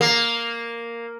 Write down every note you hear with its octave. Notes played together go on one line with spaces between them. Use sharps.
A#3